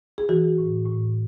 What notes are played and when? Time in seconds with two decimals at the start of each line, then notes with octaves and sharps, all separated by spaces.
0.18 G#4
0.29 E3 F#4
0.58 A2
0.86 A2